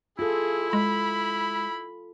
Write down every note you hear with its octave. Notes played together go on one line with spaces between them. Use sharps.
E4 F4 G#4 A4
G#3 B5